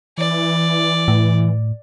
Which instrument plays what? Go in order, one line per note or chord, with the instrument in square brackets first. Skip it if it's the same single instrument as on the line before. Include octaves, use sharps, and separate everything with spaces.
[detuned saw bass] E3 [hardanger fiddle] D5
[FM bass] A2